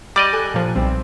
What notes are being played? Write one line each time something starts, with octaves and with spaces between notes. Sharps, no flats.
G3 D5 D#5 D6
A4 G#5 F#6
A#2 F3
B1 G3 C4